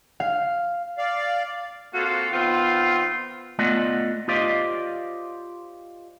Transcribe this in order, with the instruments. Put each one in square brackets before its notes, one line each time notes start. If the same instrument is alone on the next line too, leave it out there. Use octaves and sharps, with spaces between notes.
[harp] F5
[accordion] D5 F5
[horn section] A#3 C4 F4 F#4 A4
D#3 B3 C4 F4
[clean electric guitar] A3 B3 F4 D5 D#5 F#5
F4 G4 C5 D5 D#5 F5